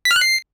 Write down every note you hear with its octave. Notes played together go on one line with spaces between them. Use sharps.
B6
F6
F#6
C7